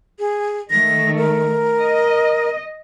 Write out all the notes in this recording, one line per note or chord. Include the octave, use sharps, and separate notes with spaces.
G#4
D#3 A3 A#6
A#4
D#5